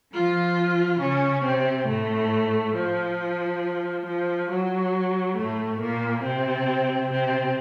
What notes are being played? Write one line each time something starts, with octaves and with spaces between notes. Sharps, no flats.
F3 F4
C#3 C#4
C3 C4
A2 A3
F3
F3
F#3
A2 A3
A#2 A#3
C3 C4
C3 C4